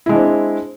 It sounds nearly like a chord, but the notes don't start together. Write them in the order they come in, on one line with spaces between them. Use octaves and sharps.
E4 G#3 D4 C4